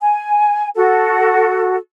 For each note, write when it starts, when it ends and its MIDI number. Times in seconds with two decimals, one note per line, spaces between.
0.01 0.68 80
0.75 1.76 66
0.75 1.76 69